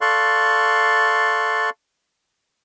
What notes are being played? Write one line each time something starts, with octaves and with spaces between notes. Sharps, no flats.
A4 D5 F5 C6 C#6 F#6